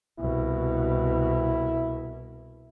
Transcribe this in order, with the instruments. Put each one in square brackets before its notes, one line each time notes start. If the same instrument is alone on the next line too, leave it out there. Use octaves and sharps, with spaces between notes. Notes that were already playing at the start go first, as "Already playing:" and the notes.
[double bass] C2 B2 [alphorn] E4